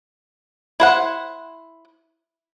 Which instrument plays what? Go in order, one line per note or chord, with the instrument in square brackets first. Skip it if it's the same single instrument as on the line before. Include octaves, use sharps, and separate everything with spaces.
[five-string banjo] E4 C5 F#5